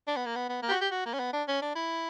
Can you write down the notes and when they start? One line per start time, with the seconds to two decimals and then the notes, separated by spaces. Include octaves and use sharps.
0.07 D4
0.16 B3
0.26 A#3
0.36 B3
0.49 B3
0.63 A#3
0.69 G4
0.72 F#4
0.81 G4
0.91 F#4
1.06 A#3
1.14 C#4
1.20 B3
1.33 D4
1.48 C#4
1.62 D4
1.75 E4